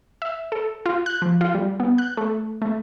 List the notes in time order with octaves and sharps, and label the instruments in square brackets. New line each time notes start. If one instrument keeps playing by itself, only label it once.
[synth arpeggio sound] E5
A4
F4
F#6
F3
F4
G3
B3
F#6
A3
A3